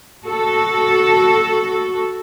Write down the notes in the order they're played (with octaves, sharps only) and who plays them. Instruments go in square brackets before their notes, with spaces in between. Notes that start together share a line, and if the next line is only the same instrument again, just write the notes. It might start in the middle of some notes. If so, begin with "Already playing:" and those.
[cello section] F#4 A4